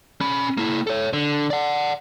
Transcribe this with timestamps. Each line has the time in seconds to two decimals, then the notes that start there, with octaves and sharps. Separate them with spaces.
0.21 C#4 B5
0.57 A#3 E4
0.87 A4 C#5
1.13 D3
1.50 D5 F#5